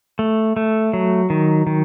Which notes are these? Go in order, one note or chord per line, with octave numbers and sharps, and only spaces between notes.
A3
A3
F#3
D#3
D#3